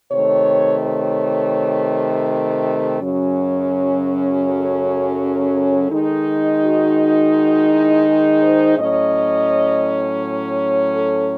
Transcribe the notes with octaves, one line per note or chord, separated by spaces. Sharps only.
C3 D#3 A3 C#5
C#5
F#2 C#3 F#3 C#4
A4
D#3 G#3 D#4
F#4
F#4
F#4
E4
G#4
C5
A2 F#3 C#4 D#5
C#5
A4